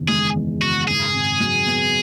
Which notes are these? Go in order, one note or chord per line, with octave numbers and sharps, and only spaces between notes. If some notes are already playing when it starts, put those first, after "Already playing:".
Already playing: F#1 E2 D#3
G#3 G#4
E2
F#1 F#4
G#2 G#4
G#1
F#3
B3